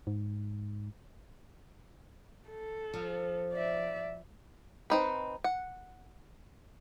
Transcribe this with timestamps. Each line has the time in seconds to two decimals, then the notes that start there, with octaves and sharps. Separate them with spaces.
0.07 G#2
2.49 A4
2.94 F3
3.53 D5 E5
4.90 C4 D#4 B4
5.44 F#5